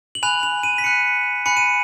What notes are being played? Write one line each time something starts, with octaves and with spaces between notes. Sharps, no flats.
F#7
G#5 B5 F#6 F7
F7
D#7
B6
B5 F#6 C#7
G#5 B5 F#6 C#7
D#7